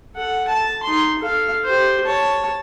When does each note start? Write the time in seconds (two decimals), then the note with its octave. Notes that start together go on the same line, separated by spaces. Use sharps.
0.14 A4 F#5
0.48 A5
0.83 D#4 C6
1.19 A4 F5
1.64 G4 C5
2.05 C#5 A5